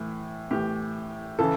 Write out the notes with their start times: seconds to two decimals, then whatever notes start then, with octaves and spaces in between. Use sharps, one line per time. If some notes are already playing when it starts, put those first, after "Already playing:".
Already playing: A2 E3
0.51 A2 E3 G4
1.39 C#3 E3 A4